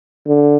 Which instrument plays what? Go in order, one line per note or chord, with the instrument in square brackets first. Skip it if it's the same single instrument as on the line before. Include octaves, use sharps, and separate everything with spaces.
[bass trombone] D3